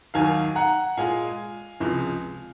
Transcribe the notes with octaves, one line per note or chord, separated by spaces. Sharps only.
D#2 D#3 F#3 F5 G#5
F#5 A#5
A#2 G#3 F5 G#5
C#2 C3 F3 G#3